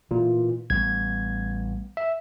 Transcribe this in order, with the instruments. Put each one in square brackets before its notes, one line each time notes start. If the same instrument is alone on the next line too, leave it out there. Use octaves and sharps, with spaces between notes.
[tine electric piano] A#2 [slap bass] E3
[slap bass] A1 G3 B3 [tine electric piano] G#6
[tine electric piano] E5